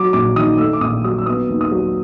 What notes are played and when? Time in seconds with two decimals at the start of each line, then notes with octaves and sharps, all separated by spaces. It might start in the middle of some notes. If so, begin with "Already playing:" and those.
Already playing: F#3 D6
0.13 A#1 D6
0.36 D#3 D#6
0.58 A3 E6
0.73 D6
0.81 A#1 D#6
1.04 F#3 D#6
1.18 E6
1.26 B3 D#6
1.49 D#2
1.61 D#6
1.72 F#3